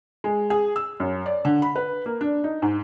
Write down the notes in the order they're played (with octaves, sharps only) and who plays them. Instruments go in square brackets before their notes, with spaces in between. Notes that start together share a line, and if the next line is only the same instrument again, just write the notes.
[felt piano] G#3
G#4
E6
F#2
D5
D3
B5
B4
A#3
D4
D#4
G#2